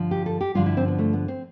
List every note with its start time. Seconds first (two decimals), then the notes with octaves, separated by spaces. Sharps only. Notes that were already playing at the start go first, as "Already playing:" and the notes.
Already playing: G2 D3 F3
0.11 G4
0.26 A4
0.41 G4
0.55 G2 D3 F3 F4
0.66 E4
0.77 C4
0.88 B3
0.99 A3
1.13 B3
1.28 C4